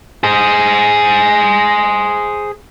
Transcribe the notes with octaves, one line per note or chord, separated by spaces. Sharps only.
G#4 C5